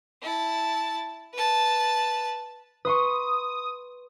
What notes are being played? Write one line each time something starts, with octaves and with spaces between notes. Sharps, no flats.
E4 A5
B4 A5
B4 C6 C#6 D#6